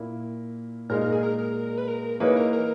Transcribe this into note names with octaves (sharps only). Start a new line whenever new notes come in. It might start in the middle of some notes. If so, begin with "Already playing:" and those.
Already playing: A#2 A#3 E4
A#2 G#3 D#4 A#4
A#4
G#4
A#4
A#4
B4
A#4
E3 A#3 D#4 G#4 B4 C#5
A#4
A#4